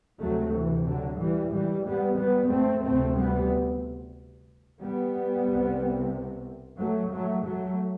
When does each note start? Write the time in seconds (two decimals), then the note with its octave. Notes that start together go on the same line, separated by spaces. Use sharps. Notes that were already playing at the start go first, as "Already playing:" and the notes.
0.21 D2 C3 F#3 A3
0.54 E3
0.87 D3 F#3
1.19 E3 G3
1.52 E3 G3
1.85 G3 B3
2.18 G3 B3
2.51 A3 C4
2.84 D2 C3 A3 C4
3.17 G3 B3
4.81 G3 B3
5.47 C2 C3
6.79 F#3 A3
7.11 F#3 A3
7.45 F#3 A3